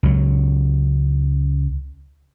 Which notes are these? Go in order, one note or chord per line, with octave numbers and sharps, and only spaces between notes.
C#2 F#3